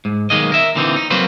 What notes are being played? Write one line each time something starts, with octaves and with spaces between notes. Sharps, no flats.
G#2
B1 D#3 G#3 A#3 D#5
A#4 E5
A#2 D3 E3 C4 C#4 D#4
D#4
F#3 A#3 C4 B4 C5